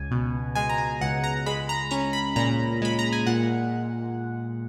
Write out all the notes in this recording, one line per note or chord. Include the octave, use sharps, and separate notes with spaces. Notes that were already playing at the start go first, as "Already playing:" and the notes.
Already playing: C#2 G#5
B2
G#3 G#5
A#5
G#5
C#2 F#5
A#5
G#3 B5
A#5
C#4 A#5
B5
A#2 A#5
G#3 B5
A#5
G#5
A#2 F#5